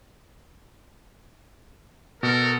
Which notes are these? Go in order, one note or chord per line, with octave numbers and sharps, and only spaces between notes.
B2 F#4 A4 A#4